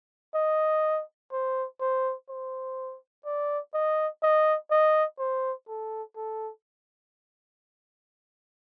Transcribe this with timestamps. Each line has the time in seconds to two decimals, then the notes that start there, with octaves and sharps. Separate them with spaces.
0.35 D#5
1.32 C5
1.81 C5
2.29 C5
3.25 D5
3.74 D#5
4.23 D#5
4.71 D#5
5.19 C5
5.69 A4
6.17 A4